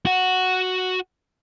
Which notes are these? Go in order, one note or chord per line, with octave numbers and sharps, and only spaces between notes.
F#4 F#5